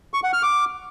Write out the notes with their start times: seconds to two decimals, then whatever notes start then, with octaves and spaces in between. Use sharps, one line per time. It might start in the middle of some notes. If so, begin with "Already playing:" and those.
0.14 C#6
0.23 F#5
0.33 F6
0.43 D6